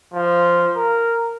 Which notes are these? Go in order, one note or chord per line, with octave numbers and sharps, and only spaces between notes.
F3
A#4